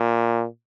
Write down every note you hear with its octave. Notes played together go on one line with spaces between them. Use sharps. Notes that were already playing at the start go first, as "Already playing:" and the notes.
Already playing: A#2